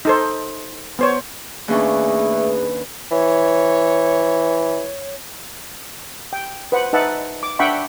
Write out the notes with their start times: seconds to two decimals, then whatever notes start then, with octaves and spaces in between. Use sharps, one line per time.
0.05 D#4 A4 C5
0.99 B3 C5 C#5
1.68 D#2 A3 C#4 D4 G#4 B4
3.11 E3 C#5
6.33 G5
6.72 B4 C5 F#5
6.93 D#4 B4 E5 F#5 A5
7.43 D6
7.59 D4 E5 F#5 G5 B5 C#6